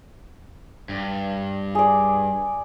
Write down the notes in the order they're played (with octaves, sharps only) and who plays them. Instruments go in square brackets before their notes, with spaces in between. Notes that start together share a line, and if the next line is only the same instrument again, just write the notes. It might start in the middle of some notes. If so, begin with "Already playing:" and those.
[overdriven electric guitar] G2
[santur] G#4 D5